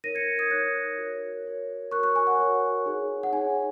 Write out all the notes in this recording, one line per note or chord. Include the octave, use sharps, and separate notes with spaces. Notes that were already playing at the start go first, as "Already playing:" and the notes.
D#4 A#4 C#5 A#6 D#7
G#6 C#7
D#6 G#6
D#4 A#4 C#5 F#6 A#6
F#4 A#4 C#5
F#4 A#4 C#5
F#4 A#4 C#5 C#6 F#6
C#6 F#6
G#5
F#5
F#4 A#4 C#5
D#4 G#4 C#5
F#5
D#4 G#4 C#5 G#5